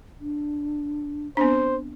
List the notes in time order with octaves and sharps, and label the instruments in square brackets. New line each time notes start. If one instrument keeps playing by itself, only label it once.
[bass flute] D4
[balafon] B3 C4 D4 [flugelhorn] C5